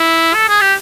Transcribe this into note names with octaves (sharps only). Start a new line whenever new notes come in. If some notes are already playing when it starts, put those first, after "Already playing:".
Already playing: E4
A4
G#4
G4